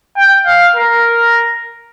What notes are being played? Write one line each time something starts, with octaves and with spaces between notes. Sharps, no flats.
G5
F5
A#4